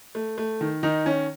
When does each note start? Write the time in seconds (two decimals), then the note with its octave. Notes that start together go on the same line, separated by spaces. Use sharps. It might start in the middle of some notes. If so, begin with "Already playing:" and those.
0.15 A3
0.38 A3
0.61 D#3
0.83 D#3 D#4
1.06 D#3 C#4